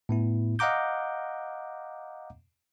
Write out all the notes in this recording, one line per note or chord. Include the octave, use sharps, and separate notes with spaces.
A2 B3 E4
D#5 F5 F#5 A#5 D6 G6